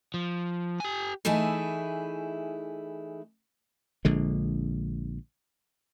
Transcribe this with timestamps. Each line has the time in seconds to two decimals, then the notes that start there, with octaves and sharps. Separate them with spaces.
0.14 F3
0.80 G4 G#5
1.25 E3 A3 D#4 E4 G#4
4.05 A#1 D3 G#3